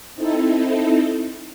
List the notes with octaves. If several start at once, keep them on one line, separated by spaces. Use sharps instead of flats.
C4 D#4 E4 A4